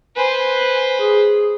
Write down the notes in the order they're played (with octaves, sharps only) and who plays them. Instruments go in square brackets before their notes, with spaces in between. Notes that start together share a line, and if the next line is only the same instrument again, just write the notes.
[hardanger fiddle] B4 C5 [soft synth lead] G#5
[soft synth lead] G#4